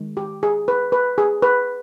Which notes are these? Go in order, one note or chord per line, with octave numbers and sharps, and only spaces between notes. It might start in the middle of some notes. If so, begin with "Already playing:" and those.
Already playing: D#3 G#3
G4
G#4
B4
B4
G#4
B4